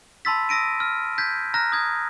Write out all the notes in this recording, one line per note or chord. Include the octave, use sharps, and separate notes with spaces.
A5 B5 C6 E6 A6 B6
D#6 E6 A#6 D7 D#7
F6
G6 G#6 B6
A#5 F6 F#6 A#6
D#6 G#6